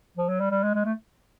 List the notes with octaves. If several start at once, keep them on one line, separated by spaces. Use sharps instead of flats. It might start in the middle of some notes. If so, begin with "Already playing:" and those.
F3
F#3
G3
G3
G#3
G#3
A3